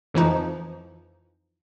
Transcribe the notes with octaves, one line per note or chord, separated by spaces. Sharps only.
F2 E3 F3 D#4